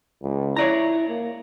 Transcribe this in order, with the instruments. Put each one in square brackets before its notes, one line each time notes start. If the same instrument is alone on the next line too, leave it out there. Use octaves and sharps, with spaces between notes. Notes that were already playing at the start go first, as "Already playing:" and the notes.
[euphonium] C#2
[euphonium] E4 [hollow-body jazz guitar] C#5 D5 A#5
[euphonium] A#3